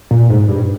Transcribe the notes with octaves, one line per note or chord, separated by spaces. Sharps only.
A#2
G#2
G2